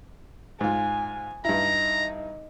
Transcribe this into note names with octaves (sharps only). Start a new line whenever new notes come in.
G#2 F4 G#5
G2 D#4 E4 A#5